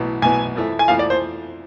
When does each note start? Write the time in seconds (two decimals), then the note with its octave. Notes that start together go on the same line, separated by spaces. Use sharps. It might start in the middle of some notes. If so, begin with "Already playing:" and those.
Already playing: B1 A2 E3 B3
0.22 B1 A2 E3 B3 G#5
0.56 F2 E3 A3
0.79 G#5
0.88 F2 E3 A3 F5
0.99 D5
1.10 C5